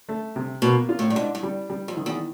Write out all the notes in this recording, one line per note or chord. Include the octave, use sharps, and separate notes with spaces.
A3
C3
B2 A#3
F4
A2
G2
G#2 D4
G2
G3
G3
F2
D#3
E2